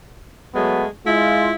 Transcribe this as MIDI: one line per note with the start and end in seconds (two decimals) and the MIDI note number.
0.55 0.87 54
0.55 0.87 56
0.55 0.87 57
0.55 0.87 59
1.06 1.54 56
1.06 1.54 64
1.06 1.54 65